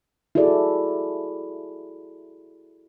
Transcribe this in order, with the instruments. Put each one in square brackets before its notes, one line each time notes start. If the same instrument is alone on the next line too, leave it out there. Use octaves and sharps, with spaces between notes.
[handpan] E4 F#4 G#4 A4 D5